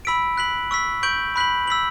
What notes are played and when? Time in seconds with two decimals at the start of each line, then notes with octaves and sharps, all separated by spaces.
0.05 B5 E6 B6 D7
0.37 F#6 B6 F#7
0.71 C#6 E6 B6
1.03 C#6 G6 D7 F#7
1.36 B5 F#6 B6 F#7
1.67 E6 B6 F#7